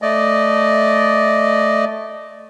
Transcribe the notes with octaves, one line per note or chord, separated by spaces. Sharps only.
A3 D5 D#5